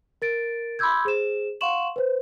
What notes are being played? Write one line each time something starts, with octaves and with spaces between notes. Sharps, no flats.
A#4 A6 D7
B5 C6 D6 E6 G6 G#6
G#4 C5 E7
F5 F#5 C6 C#6 E7 F#7
B4 C5